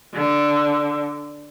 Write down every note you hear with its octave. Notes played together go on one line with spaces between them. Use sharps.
D3